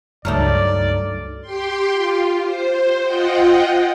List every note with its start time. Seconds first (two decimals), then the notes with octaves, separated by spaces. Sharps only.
0.25 C#2 G2 F#3 A3 D#4 D5 F6
1.41 G4 G5 C6
1.92 F4
2.40 C5
3.01 F4 D#5 F#5 G5